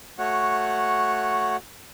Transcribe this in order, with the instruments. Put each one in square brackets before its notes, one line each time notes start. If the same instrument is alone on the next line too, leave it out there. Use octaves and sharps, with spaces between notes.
[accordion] A3 F#4 C#5 F#5